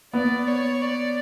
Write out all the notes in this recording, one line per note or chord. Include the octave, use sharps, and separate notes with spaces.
B3 D5
C#5
D5